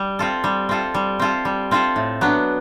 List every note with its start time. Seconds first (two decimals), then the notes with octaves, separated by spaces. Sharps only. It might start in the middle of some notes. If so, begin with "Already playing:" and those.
Already playing: G3
0.19 C4 F4 A4
0.44 G3
0.69 C4 F4 A4
0.95 G3
1.19 C4 F4 A4
1.45 G3
1.71 C4 F4 A4
1.96 A2
2.21 F#3 B3 D4